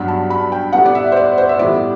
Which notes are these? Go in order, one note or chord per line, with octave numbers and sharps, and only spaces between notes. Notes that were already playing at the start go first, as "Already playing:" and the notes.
Already playing: G2 F#3 B3 B5
A5
B5
G5
A2 G3 B3 F#5
D5
E5
C5
D5
C5
E5
A2 E3 G3 B3 D5